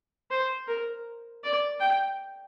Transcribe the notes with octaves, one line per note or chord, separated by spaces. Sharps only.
C5
A#4
D5
G5